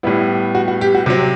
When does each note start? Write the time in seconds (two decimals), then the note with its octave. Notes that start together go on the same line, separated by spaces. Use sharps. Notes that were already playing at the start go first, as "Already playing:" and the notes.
0.03 A2 G3 B3 E4
0.55 F#4
0.68 F#4
0.81 G4
0.95 F#4
1.06 C3 F#3 C4 G4